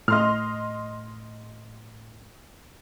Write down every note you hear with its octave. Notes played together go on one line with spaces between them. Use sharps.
A2 D#5 C6 F6